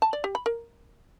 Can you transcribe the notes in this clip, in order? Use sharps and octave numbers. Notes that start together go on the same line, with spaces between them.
A5
D5
G4
B5
A#4